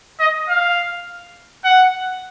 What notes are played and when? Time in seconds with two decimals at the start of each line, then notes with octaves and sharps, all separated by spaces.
0.20 D#5
0.49 F5
1.64 F#5